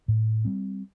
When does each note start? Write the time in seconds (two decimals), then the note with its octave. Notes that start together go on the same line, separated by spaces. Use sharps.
0.08 A2
0.45 G3 C4